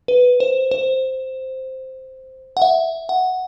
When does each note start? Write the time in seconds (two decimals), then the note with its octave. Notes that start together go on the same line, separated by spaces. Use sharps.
0.08 B4
0.40 C5
0.71 C5
2.57 F#5
2.62 E5
3.09 F#5